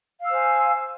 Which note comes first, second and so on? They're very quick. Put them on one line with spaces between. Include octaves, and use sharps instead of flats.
F5 E6 C5 G#5